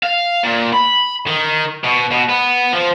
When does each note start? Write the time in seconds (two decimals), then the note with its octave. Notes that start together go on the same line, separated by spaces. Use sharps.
0.03 F5
0.43 A#2
0.73 B5
1.27 D#3
1.84 B2
2.11 B2
2.29 B3
2.72 F3